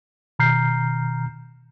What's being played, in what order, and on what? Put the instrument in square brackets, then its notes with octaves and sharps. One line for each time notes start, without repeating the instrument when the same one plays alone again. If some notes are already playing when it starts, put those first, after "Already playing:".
[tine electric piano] B2 D#3 A#5 F6 G6 C7